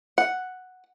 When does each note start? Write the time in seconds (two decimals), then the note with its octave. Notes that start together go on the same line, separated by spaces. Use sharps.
0.18 F#5